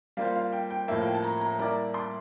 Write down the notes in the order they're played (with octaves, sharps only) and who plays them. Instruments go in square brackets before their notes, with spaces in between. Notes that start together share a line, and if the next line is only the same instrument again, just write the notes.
[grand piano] G3 A#3 F4 C5 [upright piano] F5
[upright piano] F5
G5
G5
[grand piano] A2 F3 A#3 [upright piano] E5
[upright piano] F5
G5
A5
A#5
A#5
[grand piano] G3 A#3 E4 A#4 D5 [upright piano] A#5
[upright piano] C6